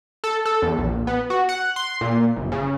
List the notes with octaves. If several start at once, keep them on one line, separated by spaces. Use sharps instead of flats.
A4
A4
E2
A#1
B3
F#4
F#5
C6
A#2
G1
C#3